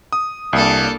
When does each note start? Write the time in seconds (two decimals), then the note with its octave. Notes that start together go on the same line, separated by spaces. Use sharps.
0.13 D#6
0.53 C2 A#3 D4 A4